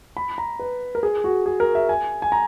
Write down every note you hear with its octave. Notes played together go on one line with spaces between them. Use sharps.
B5
A#5
B4
A#4
G#4
F#4
G#4
A#4
E5
G#5
G#5
A#5